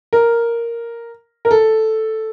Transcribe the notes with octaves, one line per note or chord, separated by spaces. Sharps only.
A#4
A#4
A4